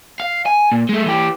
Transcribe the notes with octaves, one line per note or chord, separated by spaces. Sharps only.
F5
G#5
A#2
G#3 A3
E3 G4